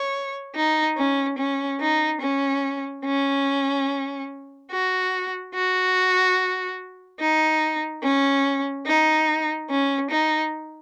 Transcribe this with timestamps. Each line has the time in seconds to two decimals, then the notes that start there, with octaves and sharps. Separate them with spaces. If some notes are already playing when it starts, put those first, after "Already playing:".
Already playing: C#5
0.56 D#4
0.97 C#4
1.38 C#4
1.80 D#4
2.22 C#4
3.05 C#4
4.71 F#4
5.54 F#4
7.20 D#4
8.03 C#4
8.86 D#4
9.70 C#4
10.11 D#4